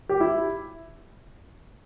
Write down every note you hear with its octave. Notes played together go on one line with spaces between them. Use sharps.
G4
E4